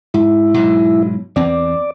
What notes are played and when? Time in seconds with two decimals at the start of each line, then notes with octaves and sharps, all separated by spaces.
0.14 G#2 E4
0.54 G#2 B2 F#3
1.36 E2 C4 D5